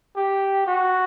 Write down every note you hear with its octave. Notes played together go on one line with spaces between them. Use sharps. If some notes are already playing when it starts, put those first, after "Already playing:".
G4
F#4